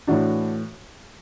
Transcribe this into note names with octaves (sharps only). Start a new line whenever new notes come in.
A2 E3 D4 F#4